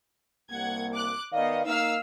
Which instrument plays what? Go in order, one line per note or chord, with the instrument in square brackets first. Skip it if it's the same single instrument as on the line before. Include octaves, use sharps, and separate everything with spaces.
[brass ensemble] C2 G3 A#3 [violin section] F#5 G#6
[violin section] D6 F#6
[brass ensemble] D#3 D5 F5 [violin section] B3 D#5
[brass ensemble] A#3 D#4 [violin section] F5 E6 F6